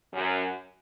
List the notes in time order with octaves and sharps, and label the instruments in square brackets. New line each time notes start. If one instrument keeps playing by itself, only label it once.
[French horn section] F#2